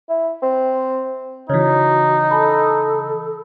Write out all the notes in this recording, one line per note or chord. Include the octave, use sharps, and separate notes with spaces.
E4
C4
C#3 E3 D#4 F#4 C#5
A4 A5 B5